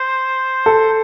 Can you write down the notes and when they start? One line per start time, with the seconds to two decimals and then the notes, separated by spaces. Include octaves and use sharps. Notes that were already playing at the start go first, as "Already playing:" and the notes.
Already playing: C5
0.66 A4